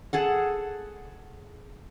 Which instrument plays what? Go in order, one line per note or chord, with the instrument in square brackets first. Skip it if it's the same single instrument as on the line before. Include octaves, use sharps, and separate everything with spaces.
[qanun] G#4 A4 F#5